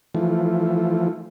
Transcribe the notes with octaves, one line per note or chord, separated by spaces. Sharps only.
E3 F3 A3